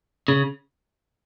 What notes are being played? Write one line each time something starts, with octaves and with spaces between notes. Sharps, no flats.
C#3